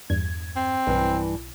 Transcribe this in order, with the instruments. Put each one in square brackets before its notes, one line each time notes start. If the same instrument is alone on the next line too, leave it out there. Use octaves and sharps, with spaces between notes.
[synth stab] E2 G2 G#6
[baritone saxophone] C4
[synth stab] B1 [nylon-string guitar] G2 E3